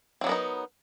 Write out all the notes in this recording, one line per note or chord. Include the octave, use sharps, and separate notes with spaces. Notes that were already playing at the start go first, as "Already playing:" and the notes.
F#3 B3 C4 D#4 A#4